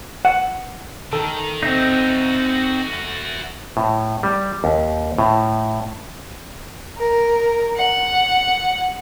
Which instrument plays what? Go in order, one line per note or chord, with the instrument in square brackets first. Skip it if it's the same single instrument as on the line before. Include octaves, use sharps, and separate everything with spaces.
[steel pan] F#5
[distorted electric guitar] D#3 [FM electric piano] A4
[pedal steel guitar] C4 D#4 [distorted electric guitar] F#4 E5
[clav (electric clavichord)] A2
G3
D#2
A2
[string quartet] A#4
F#5